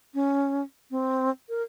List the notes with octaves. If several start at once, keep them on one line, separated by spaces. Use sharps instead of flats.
C#4
C4
A#4